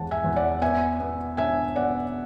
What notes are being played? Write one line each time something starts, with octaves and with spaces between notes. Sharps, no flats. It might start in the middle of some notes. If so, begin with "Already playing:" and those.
Already playing: E2 E3 G#3 F#5 A5
E5 G#5
E2
D5 F#5
B3 E5 G#5
B3
D4 E5 G#5
B3 D5 F#5